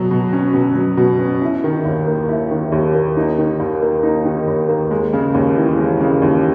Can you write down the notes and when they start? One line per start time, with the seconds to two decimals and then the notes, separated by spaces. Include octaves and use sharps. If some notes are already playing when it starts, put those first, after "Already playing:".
Already playing: B2 F#3
0.11 B2
0.33 C#4
0.54 B2
0.75 F#3
0.97 B2
1.19 C#4
1.42 E4
1.64 D#3
1.85 D#2
2.07 A#3
2.29 E4
2.51 D#3
2.72 D#2
2.94 A#3
3.17 D#4
3.39 D#3
3.60 D#2
3.82 A#3
4.03 D#4
4.25 D#3
4.47 D#2
4.69 A#3
4.91 G#3
5.13 C#3
5.34 D#2
5.57 E3
5.79 G#3
6.01 C#3
6.22 D#2